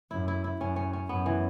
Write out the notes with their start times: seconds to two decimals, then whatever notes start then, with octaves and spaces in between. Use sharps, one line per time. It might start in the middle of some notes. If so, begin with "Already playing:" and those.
0.11 F#2 E4
0.28 E4
0.44 E4
0.61 F#2 C#4
0.76 C#4
0.93 C#4
1.09 F#2 B3
1.26 E3